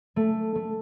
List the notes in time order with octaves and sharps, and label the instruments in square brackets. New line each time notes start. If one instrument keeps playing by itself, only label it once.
[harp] A3
A3